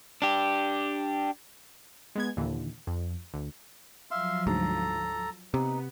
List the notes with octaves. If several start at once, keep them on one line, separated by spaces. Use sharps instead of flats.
D4 G4
G#3 B3 G#6
D#2 A#2 D3 E3
F2
D2
F3 F#3 E5 F5 C6
D2 G#2 A4 A#5
C3 B3 D#4